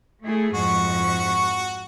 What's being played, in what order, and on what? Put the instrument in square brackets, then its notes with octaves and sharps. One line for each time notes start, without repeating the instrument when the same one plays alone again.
[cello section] A3 E4 G#4
[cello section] F2 G#2 [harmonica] F#4 C#6